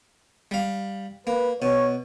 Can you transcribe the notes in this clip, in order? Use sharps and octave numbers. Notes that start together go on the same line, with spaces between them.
G3 F5
A#3 B4
B2 C#5